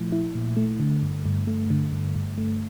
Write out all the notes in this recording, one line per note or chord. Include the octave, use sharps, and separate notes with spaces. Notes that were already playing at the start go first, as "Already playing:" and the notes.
Already playing: A#2 F3 A3 E4
E4
A#2
A3
D3
G2
G2
A3
D3
G2
G2
A3